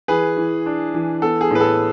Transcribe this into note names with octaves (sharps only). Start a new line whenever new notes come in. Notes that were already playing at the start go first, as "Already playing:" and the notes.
E3 G#4 B4
E3
D4
E3
B3 A4
G#4
A2 B4
A4